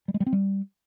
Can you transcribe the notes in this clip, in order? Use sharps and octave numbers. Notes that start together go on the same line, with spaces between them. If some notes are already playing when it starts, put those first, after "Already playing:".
G3
G#3
G3
C4
G3